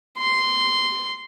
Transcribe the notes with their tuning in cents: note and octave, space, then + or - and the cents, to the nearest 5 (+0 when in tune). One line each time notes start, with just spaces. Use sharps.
C6 -10